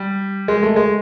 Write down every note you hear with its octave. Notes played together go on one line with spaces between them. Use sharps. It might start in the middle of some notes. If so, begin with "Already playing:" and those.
Already playing: G3
G#3
A3
G#3